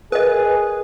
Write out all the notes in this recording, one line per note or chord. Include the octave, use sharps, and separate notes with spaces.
G#4 A#4 B4 D#5